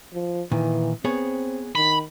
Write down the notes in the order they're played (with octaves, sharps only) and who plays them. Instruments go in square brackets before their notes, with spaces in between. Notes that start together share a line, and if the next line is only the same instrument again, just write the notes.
[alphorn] F3
[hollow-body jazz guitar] A#2 D#3 [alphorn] E3
[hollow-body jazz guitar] B3 G#4 C#5 [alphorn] C4
[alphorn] D#3 [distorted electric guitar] B5